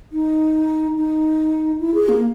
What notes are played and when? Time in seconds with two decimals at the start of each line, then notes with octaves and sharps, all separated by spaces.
0.12 D#4
0.97 D#4
1.80 E4
1.94 G#4
2.09 A#3